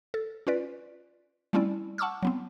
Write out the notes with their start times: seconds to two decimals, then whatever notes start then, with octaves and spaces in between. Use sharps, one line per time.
0.14 A4
0.47 C#4 F4 B4 D5
1.53 G3 A3 C4 C#4 E4 D5
1.98 F#5 A5 C#6 D6 E6 F6
2.23 F#3 B3 C4